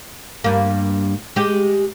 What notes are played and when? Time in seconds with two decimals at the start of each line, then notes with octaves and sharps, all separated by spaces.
0.44 G2 A#3
1.36 G#3 G4